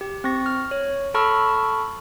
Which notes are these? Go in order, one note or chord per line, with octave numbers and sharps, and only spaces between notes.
G4
C4 C#6 A#6
F6
C#5
A4 A5 B5 C#6 E6 F6